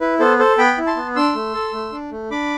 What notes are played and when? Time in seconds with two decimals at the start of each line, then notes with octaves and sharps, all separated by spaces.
0.01 E4 B4
0.19 B3 A4 C5
0.39 A4 C5
0.58 B3 G5 B5
0.78 E4
0.87 A5 C6
0.96 B3
1.16 D4 C6 E6
1.35 A3
1.54 A4
1.73 A3
1.92 D4
2.11 A3
2.31 D4 B5 D6